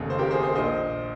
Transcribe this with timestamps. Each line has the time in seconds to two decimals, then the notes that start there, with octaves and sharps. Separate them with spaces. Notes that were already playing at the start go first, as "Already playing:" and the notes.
Already playing: F1 D#2 C#3
0.10 C5
0.19 G4 A#4
0.31 G#4 C5
0.43 G#4 C5
0.55 A#1 A#2 C5 D#5